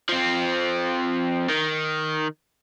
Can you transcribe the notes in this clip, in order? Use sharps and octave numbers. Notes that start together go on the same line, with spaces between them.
F3 C4
D#3